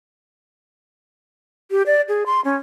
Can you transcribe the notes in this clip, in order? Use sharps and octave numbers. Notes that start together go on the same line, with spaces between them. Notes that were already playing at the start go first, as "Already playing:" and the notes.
G4
D5
G#4
C6
C#4